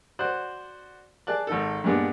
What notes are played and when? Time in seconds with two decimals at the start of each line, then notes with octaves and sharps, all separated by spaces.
0.19 F#4 C5 D5 F#6
1.27 G#4 D5 A5 F#6
1.47 G#1 D#4 A4
1.84 G2 A#2 G#3 B3 D4